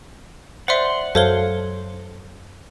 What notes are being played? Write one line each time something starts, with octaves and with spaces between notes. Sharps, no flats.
C5 D5 E5 F#5 C6
F#2 A4 C5 C#5 F5 G7